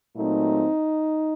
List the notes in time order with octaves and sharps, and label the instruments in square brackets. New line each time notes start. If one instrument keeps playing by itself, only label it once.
[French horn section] A#2 F#3 A3 C4 D#4